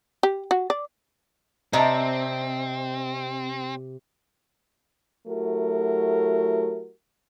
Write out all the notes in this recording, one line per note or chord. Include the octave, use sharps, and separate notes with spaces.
G4
F#4
D5
C3 C4 D5 D#5 A5 A#5
F#3 A3 E4 F#4 G4 A#4